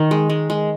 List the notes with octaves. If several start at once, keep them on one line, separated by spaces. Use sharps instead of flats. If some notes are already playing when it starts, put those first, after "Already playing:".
Already playing: D#3 D#4
G#3
G#3
G#3